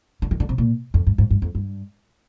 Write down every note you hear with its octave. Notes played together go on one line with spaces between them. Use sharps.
D3
D#3
D3
C3
A#2
F2
G2
G#2
G2
F2
G2